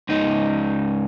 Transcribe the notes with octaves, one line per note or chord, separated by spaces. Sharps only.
C#2 D#4